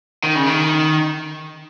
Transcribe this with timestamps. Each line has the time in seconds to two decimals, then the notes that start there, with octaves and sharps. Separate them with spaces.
0.23 D#3
0.35 C#3
0.46 D#3